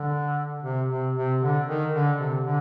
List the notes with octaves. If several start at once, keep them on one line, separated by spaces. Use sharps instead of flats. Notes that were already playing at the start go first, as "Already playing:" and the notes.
Already playing: D3
C3
C3
C3
D3
D#3
D3
C3
D3